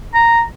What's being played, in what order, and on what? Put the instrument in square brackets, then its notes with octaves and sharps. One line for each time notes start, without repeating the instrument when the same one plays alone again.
[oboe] A#5